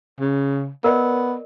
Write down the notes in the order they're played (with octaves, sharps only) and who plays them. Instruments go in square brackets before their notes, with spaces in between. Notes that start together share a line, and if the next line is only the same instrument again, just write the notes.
[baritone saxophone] C#3
[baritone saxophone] B3 [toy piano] A#4 D5 D#5